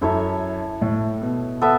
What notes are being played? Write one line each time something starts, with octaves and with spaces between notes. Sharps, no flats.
F#2 E4 A4 C#5 E5
A2
B2
B3 A4 E5